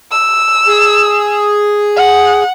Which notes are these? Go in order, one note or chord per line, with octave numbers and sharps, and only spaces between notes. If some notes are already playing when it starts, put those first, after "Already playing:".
E6
G#4
F#5